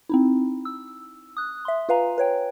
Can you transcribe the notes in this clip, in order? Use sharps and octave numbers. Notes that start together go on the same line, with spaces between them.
C4 D#4 E4
E6
D#6 F#6
E5 C6
F4 B4 F5 G#5 A#5
B4 C#5 G5